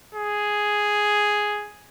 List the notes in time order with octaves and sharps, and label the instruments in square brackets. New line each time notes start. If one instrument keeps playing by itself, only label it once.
[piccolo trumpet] G#4